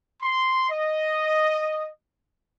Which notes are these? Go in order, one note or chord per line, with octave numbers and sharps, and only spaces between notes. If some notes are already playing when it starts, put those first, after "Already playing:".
C6
D#5